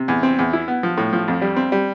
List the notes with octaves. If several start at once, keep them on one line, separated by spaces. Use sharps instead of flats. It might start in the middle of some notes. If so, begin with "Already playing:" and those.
Already playing: C3
E2
C4
E2
E4
B3
F3
A2
F3
F2
G3
C4
G3